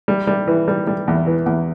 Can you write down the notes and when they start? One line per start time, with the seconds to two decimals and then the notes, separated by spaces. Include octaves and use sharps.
0.08 G3
0.27 G3
0.47 E3
0.68 G3
0.87 G3
1.08 E2
1.27 E3
1.46 E2